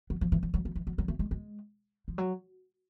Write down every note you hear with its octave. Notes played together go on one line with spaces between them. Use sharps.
F#3
F3
E3
F3
F#3
F3
E3
F#3
F#3
A3
G#3
G#3
F3
F#3